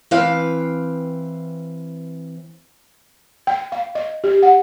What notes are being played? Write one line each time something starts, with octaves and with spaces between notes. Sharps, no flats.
E3 C4 B4 F5 G5
G5
F5
D#5
G4
F#5